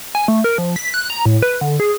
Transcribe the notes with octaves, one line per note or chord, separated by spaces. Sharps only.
G#5
A3
A#4
F3
B6
F#6
A#5
A2
B4
D3
G#4